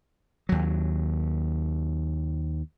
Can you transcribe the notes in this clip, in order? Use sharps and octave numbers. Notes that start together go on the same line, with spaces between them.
D#2 F#3